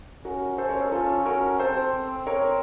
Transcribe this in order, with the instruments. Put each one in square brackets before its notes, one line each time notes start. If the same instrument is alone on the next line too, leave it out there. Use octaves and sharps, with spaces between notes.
[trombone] C#4 [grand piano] F#4 A#4
[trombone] C#4 [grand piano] A4 C5
[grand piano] A#4 C#5
A4 C5
[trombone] C#4 [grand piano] F4 A4
[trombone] C#4 [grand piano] F#4 A#4
[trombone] C4 [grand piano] A4 C5
[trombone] C4
[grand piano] A#4 C#5